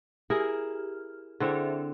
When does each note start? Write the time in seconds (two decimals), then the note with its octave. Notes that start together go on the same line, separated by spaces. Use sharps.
0.30 E4 G4 G#4 A#4 F6
1.40 D3 C4 E4 G#4 C5 E5